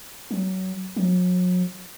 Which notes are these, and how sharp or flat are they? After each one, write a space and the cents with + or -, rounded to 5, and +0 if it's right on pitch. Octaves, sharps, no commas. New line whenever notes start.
F#3 +20
F#3 -40